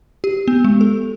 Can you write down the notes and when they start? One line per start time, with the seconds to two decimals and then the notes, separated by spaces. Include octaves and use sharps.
0.24 G4
0.48 B3
0.64 G#3
0.81 A4